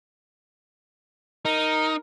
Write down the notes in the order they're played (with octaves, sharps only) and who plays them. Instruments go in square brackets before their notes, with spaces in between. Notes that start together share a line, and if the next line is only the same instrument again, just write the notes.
[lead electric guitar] D#4 [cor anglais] A#4